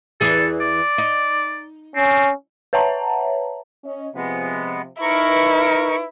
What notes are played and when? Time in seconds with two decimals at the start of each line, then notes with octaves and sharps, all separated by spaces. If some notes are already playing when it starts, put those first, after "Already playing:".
0.21 E2 E3 G#4 A4
0.61 D5
0.98 D#4
1.96 C4 C#4
2.73 B4 C#5 E5 F#5 A5 A#5
3.84 C#4 D#5
4.15 C3 F3 G#3 B3
5.01 D#4 E4 A#4 B4 C#6